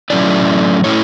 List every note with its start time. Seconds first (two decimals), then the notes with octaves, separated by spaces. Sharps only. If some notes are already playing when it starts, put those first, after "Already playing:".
0.10 A2 F#3 A3 C#4 E4 D5
0.84 A2 F#3 A3 C#4 E4 C#5